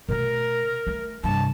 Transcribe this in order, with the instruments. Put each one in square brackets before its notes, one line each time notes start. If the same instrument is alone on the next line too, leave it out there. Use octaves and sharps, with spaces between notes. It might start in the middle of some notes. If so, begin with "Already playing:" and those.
[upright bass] B2 A3 [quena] A#4
[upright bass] A3
[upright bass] G2 C3 [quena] A5